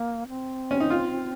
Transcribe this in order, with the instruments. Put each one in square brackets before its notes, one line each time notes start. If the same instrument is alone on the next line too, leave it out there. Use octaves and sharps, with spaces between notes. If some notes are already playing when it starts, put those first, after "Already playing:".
Already playing: [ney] A#3
C4
[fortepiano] C#4
D#4
F4